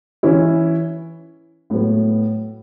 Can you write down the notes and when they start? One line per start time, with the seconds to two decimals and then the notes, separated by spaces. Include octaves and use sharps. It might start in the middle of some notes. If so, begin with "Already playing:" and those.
0.23 E3 C#4 E4
1.70 A2 F#3 B3